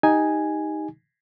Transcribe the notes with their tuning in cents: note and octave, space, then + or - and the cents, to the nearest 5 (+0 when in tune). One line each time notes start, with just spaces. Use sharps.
D#4 +5 G4 +0 G#5 +0